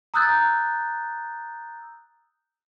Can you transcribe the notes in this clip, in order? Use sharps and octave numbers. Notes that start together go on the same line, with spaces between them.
A#5 D#6 E6 F#6 G6 A6